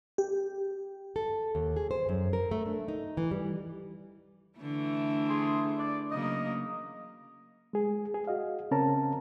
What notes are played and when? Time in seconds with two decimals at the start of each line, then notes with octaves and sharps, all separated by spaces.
0.18 G4
1.16 A4
1.55 D#2
1.76 G#4
1.91 C5
2.09 F#2
2.33 A#4
2.51 A3
2.66 D4
2.88 D#4
3.17 E3
3.31 G3
4.58 D3 E3 A3
5.29 G#4 C6
5.78 D5
6.11 C#3 F#3 A#3 D#5
7.73 G#3 G#4
8.14 G#4
8.27 F#4 D#5 F5
8.71 C#3 C4 C#4 A#4 A5 A#5